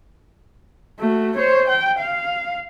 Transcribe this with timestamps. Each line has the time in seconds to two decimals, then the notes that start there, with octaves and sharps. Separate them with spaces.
1.00 A3 F#4
1.36 C5 C#5
1.68 G5
1.99 F5